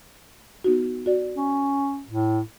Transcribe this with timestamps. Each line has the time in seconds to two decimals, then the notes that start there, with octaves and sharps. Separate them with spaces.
0.64 B3 D#4 F#4
1.06 F#4 D5
1.37 C#4
2.08 A2